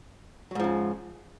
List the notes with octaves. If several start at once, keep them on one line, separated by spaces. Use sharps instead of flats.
G#2 C#3 F3 F#3